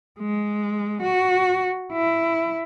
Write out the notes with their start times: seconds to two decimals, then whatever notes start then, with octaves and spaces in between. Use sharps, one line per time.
0.19 G#3
1.02 F#4
1.93 E4